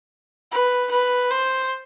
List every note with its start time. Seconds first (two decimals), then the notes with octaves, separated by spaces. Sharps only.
0.52 B4
0.91 B4
1.31 C5